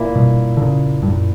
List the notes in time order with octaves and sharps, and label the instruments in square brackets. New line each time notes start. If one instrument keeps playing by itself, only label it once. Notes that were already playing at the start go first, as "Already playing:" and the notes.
Already playing: [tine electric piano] A#2 A#3 E4
[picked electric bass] G2 B2
D3
A#2 C#3
G2
F#2 A#2